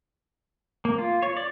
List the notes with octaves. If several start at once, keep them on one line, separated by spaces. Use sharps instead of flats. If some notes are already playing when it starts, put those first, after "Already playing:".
A#3
F4
C#5
D5